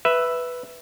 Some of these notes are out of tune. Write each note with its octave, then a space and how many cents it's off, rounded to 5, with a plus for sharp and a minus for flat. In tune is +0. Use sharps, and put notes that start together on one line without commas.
B4 +0 E5 +0